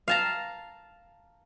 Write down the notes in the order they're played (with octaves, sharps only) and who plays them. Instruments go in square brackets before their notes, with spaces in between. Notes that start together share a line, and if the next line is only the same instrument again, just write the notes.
[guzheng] F5 A5 A#5